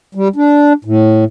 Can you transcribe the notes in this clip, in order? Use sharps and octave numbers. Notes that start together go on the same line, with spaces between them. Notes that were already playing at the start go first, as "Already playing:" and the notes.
G3
D4
A2